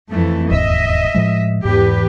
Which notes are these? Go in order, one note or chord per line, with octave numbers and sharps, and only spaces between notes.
F2 E3 A3
E1 D#2 G#2 D#5 E5
A2 F3 G#3
E2 G#2 G4 B4